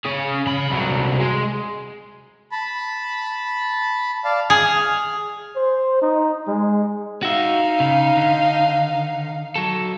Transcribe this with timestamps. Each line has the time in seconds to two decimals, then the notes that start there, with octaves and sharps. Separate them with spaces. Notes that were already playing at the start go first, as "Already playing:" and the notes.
0.06 C#4 G#4
0.46 C#3 B5
0.70 C2 F#3
1.20 G#3
2.52 A5 B5
4.24 D5 F5 A5
4.50 G#4 F6
5.56 C5
6.02 D#4
6.48 G#3
7.23 D#4 F#4 E5 F5
7.80 C#3
8.17 D3
9.56 F#3 A4